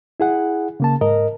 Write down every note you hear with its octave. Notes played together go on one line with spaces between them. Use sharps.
E4 G#4 F#5
C#3 A#3 A5
G#2 A#4 D#5